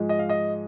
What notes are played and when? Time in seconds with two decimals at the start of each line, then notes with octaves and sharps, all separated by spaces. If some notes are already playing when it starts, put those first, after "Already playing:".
Already playing: G#2 F3 G#3
0.09 D#5
0.19 F5
0.29 D#5